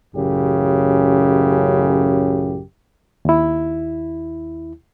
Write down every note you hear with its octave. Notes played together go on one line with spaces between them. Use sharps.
A1 F#2 C#3 G4
D#2 E4